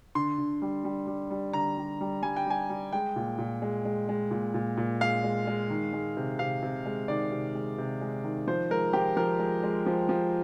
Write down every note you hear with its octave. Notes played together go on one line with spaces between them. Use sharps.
D3 C6
D3
G3
G3
G3
G3
D3 A#5
G3
G3
G3 G#5
G5
G3 G#5
G3
G#3 G5
A#2
A#2
G#3
G#3
G#3
A#2
A#2
A#2
G#3 F5
G#3
G#3
D#3
G#3
C3
C3 F5
C3
G#3
D#3 D5
C3
G#3
C3
G#3
D#3
F3 C5
G#3 A#4
F3 G4
F3 A#4
G#3
G#3
F3
F3